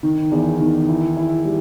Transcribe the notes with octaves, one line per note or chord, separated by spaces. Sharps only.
D#3
E2
D#3
E4
E4
G3